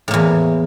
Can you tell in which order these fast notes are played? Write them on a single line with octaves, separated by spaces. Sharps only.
A2 A#3 E2